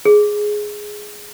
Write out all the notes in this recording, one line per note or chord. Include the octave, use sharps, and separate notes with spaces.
G#4